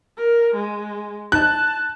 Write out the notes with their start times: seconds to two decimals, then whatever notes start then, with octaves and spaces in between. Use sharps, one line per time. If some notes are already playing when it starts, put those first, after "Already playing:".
0.17 A#4
0.55 G#3
1.32 A5 F#6